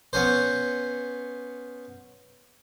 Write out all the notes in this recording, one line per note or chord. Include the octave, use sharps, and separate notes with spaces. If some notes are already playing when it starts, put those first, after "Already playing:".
B3 C#4 C5